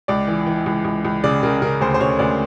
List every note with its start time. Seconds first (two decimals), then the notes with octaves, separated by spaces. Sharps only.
0.08 C#2 D5
0.27 E3
0.46 E3
0.66 C#2
0.85 C#2
1.05 C#2
1.24 C#3 D5
1.43 C#3 A#4
1.62 C#3 A#4
1.81 D2 C5
1.94 C5
2.00 C#3 C#5
2.19 D2 D5